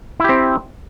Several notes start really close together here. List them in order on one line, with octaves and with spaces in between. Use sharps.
E4 G4 C4